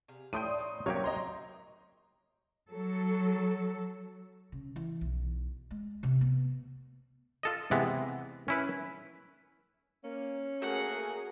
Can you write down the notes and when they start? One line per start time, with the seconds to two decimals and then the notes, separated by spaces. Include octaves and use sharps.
0.08 C3 G#4 F5
0.33 A2 A3 D4 F4 G5 C6 D#6 D#7
0.58 B3 C#4 D#4
0.86 C3 F#3 A#3 G4 C#5
1.04 C4 E4 D#5 A#5 C6
2.70 F#3 A4
4.52 C#3
4.76 E3
5.01 B1
5.71 G#3
6.03 C3
6.21 B3
7.43 F4 A4 D#5
7.71 C3 E3 G#3 B3
8.48 C#4 E4 B4
10.04 A#3 C#4
10.62 A3 A#3 F#4 G#4 A#4 F#5